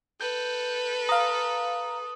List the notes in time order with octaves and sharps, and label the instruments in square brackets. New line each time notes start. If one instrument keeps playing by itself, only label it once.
[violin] A4 B4 [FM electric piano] G6
[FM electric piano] F5 A#5 [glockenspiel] D#6